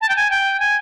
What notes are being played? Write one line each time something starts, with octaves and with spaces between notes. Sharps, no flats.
A5
G5
G#5
G5
G#5